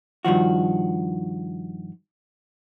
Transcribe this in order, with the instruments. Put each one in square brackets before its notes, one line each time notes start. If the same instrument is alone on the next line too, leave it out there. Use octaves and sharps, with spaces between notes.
[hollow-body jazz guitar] G2 D#3 F3 F#4